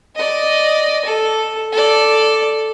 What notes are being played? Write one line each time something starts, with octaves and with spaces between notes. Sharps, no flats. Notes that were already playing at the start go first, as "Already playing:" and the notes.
D5 D#5
A4
A4 D5